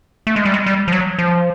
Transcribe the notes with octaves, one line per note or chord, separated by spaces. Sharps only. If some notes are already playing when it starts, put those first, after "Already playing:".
A3
G#3
G3
G#3
G3
F3
F#3
F3